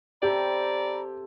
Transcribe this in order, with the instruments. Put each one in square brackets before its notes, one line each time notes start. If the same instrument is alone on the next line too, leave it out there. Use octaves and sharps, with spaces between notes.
[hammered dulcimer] C3 A4 G5 [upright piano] G4 [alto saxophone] D5 [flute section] A#5 B5